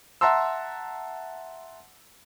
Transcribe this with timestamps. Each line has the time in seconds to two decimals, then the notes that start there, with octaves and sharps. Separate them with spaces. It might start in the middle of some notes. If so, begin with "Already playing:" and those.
0.21 E5 F#5 A5 A#5 C6 E6